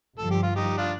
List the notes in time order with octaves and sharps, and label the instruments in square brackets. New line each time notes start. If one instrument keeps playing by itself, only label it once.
[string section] G1 G2 F3 [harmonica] A4
[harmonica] G4
F4
D#4 G4
D4 F4